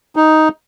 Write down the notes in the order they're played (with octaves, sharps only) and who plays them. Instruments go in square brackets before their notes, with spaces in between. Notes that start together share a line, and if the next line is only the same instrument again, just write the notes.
[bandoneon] D#4